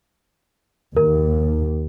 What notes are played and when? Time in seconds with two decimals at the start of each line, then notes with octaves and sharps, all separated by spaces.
0.97 D#2 A#4